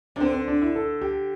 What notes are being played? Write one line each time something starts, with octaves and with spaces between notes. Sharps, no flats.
C3 D4
D3 C4
C4
D4
E4
A4
G4